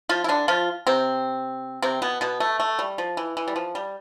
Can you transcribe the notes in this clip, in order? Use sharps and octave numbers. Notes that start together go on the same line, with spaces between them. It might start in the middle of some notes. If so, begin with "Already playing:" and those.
F3 F4
E4
D3 D4
F3 F4
C3 C4
C3 C4
B2 B3
B2 B3
A3
A3
G3
F3
E3
E3
G3
F3
G3